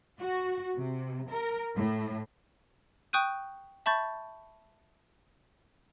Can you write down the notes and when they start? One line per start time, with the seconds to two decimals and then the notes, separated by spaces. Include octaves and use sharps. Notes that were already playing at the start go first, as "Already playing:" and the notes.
0.20 F#4
0.76 C3
1.30 A#4
1.75 A2
3.13 G5 C#6 D#6 F#6 G6 D#7
3.86 E5 A5 B5 C#6 G6 A6